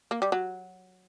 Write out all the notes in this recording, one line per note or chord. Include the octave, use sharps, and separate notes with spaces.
A#3
G3
F#3